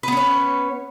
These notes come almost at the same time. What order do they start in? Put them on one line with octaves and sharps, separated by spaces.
B4 B3 C#4 C#5